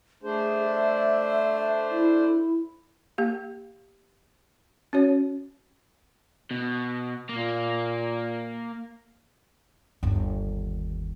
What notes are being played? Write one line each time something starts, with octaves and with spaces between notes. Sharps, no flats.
A3 D4 G#4 C5
E5
E4
A#3 G4 F5
C#4 F#4 C#5
B2
A#2 A#3
G1 D#2